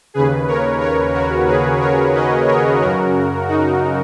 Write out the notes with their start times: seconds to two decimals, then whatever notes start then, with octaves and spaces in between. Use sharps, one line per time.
0.14 D#2 C#3 G#4 B4
0.47 A#4 C#5
0.81 A#4 C#5
1.14 F#4 A#4
1.48 G#4 B4
1.81 A#4 C#5
2.15 B4 D#5
2.48 A#4 C#5
2.81 F#2 C#3 F#4 A#4
3.48 D#4 F#4